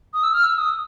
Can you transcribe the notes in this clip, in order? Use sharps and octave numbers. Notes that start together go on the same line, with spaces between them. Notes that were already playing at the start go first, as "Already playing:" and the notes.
D#6
E6
F6
E6
D#6